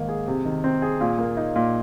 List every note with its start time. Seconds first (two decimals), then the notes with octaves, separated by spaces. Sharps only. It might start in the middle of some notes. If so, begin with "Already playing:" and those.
Already playing: G#2 D#3 A#3
0.09 G#4
0.28 C3
0.45 D#3
0.64 C4
0.82 G#4
1.01 A#2
1.19 A#3
1.37 D#4
1.56 A#2